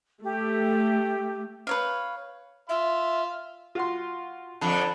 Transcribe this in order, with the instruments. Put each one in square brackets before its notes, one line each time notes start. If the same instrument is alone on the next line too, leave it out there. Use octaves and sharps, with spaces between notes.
[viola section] A3 [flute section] G4
[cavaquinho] B4 C#5 F5
[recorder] E5 [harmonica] F5 C6
[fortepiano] F4 F#4 C6
[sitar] F2 D3 [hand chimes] A5 B5 F#6